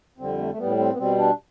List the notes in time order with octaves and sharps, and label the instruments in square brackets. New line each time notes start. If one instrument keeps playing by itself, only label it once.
[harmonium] F2 D3 G3 C4
A3
A3
A2 G3 B3
C4
B3
B2 G3 C4
D4